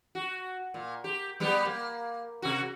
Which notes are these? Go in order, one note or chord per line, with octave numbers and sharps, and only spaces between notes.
F#4
A#2
G4
G3 B3 G4
A#3
C3 F#4